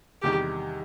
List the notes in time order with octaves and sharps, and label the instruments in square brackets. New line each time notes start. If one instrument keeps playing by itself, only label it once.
[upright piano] E2 C3 D#3 G3 D#4 [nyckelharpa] G4